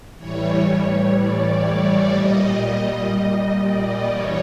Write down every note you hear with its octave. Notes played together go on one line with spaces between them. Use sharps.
A2 E3 G3 C#5
D5
A#2 G3 D#5
D5
G2 E3 G3 C#5